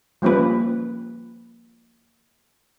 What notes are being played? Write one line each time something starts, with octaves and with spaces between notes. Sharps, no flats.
F3 G3 A#3 C#4 B4